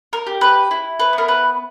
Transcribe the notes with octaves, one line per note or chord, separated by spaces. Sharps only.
A#4
G4
B4
E4
B4
B3
A#4
B4